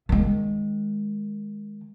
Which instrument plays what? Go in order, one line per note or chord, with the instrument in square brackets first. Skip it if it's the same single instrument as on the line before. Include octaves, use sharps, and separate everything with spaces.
[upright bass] D#3 G#3